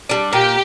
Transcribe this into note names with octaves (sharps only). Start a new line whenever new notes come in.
G3 D4
A#2 G4